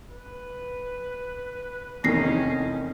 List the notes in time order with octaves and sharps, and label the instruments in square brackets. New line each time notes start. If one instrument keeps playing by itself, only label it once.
[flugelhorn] B4
[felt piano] F1 [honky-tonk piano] E2 D#3 D#4 [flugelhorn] C#4 [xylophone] A#6 C7